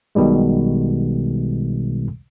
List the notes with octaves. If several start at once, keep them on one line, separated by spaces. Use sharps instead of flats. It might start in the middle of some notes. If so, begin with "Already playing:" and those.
B1 B2 D#3 G3 G#3